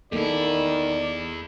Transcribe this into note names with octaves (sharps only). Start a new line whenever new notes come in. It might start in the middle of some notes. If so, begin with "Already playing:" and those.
E2 D#3 A#3 E4 A4 D5